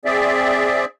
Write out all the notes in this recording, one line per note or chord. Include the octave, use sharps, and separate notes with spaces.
C4 G#4 D5 E5